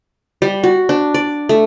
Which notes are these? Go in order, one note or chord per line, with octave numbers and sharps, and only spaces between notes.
G3
F#4
D4
D5
A3